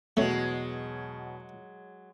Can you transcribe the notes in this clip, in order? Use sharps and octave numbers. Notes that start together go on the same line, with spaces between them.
E2 B2 F#3 G#3 A3 C#4